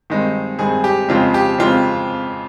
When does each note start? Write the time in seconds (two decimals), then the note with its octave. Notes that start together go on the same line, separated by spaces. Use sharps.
0.10 G2 D#3 G#3 C4
0.59 G2 D#3 G#3 C4 G#4
0.84 G4
1.09 F2 C#3 G#3 C4 F4
1.34 G4
1.59 F2 C#3 G#3 C4 F4